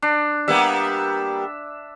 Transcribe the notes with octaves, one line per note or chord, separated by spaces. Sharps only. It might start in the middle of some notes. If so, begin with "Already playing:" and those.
D4
G3 A#3 B3 E5